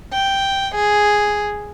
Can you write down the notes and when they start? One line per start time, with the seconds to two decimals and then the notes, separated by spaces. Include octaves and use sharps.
0.12 G5
0.74 G#4